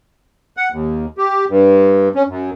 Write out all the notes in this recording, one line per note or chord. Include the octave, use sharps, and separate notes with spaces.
F#5
D#2
G4
G2
C#4
F#2